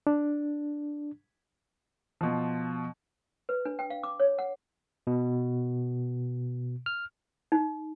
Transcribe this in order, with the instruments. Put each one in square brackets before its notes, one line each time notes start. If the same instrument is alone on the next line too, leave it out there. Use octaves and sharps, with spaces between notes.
[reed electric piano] D4
[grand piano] B2 F3
[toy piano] B4
D4
G5
F5
D6
C#5
F#5
[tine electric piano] B2
F6
[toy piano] D#4